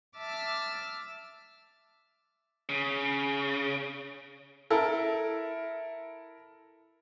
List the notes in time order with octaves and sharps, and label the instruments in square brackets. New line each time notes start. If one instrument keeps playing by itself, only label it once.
[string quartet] E5 A5 D6 E6 F6 A6
[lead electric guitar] C#3
[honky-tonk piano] E4 A4 A#4